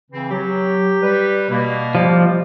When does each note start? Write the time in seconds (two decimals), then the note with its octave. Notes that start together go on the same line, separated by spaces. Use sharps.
0.11 C#3 E3 C4
0.31 F#3 G4
1.01 G3 B4
1.50 B2 A#3
1.95 F3 G3